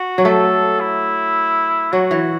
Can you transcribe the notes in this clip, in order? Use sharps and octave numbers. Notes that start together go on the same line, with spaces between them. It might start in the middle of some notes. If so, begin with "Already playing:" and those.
Already playing: F#4
F#3
A3 A4
E4
F#3 F#4
E3